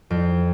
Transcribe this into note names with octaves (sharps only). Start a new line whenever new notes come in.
F2